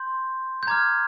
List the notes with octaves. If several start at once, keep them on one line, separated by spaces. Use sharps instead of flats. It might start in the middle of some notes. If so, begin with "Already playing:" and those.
Already playing: C6 G6
G6
A#5 D6 F6 G#6